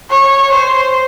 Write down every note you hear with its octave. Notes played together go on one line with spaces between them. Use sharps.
C#5
C5